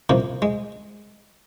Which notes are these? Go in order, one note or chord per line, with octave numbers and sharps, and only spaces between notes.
C2 C3 F3 A#3
G#3